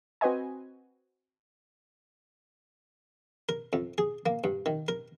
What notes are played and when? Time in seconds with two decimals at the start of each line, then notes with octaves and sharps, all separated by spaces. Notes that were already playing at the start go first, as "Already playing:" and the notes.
0.21 C4 F#4 B4 C5 D#5 G#5
3.49 A#4
3.73 F2
3.98 G#4
4.26 A#3
4.44 G2
4.66 D#3
4.88 A#4